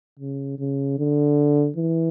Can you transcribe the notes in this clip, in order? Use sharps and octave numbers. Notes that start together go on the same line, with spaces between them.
C#3
C#3
D3
E3